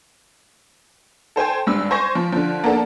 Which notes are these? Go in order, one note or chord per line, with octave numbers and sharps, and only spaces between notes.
A4 C5 G5 G#5
G#1 G2 E6
C5 G#5 C#6 A#6
F3
D3 F3
A#3 B3 D4 A4